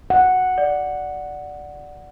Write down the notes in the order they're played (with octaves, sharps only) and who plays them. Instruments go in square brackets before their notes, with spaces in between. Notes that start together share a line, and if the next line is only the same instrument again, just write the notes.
[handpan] F#5
[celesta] D5